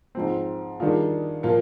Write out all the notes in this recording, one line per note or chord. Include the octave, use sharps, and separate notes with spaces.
G#2 F3 C4
D#3 G3 D4 F4 G#4
A#2 F3 A#3 F4